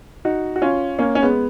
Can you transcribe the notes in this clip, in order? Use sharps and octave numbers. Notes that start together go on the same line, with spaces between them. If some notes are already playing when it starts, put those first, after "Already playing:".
D#4 F#4
F#4
C#4 F4
A#3 C#4
C#4
G#3 B3